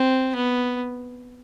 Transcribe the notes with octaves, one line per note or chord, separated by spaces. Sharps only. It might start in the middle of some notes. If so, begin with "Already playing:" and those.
Already playing: C4
B3